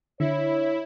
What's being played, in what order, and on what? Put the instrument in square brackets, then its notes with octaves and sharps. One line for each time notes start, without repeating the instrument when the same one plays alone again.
[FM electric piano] D3 [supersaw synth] E4 [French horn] C#5